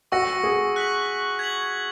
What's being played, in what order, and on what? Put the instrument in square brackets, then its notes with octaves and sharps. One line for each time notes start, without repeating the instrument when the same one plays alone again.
[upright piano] F#4 [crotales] C#6 E6 A#6 C#7
[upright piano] G#4
[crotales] F#6 B6 F#7
G#6 B6 F#7